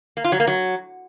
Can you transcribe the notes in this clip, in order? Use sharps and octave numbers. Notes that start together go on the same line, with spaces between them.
A#3
F4
F#3
A#3
F#3